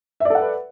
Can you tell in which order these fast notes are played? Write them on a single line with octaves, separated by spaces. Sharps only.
E5 D5 A4 F#5 B4